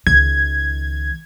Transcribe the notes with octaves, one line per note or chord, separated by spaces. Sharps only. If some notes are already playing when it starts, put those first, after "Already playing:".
C#2 D#3 G#6